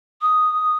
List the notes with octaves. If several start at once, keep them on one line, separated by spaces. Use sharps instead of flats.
D#6